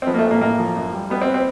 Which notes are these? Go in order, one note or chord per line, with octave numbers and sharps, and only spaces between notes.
C4
F3 B3
A#3
A3
A1
A#3
A2 A#3
F3
F#2
G3
G3 B3
C4
C4